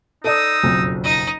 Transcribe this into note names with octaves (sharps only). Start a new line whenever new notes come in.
D#4 A4 D5 D#6 E6
F#1 B1 F2
D#4 D#5